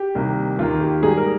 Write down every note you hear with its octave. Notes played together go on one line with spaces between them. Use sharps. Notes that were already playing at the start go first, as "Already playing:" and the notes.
Already playing: G4
C2 C3 D#3 A#3
D#2 D#3 A#3 F4
G4
G#2 G3 A#3 G#4
A#4